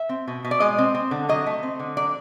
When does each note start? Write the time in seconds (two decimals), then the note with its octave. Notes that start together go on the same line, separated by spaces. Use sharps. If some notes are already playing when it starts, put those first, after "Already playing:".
Already playing: E5
0.09 C4
0.28 B2
0.45 B2
0.51 D5
0.60 G#3 D#5
0.78 C4
0.95 C4
1.11 D3
1.29 F#3 D#5
1.46 A3
1.63 C4
1.79 D3
1.97 F#3 D5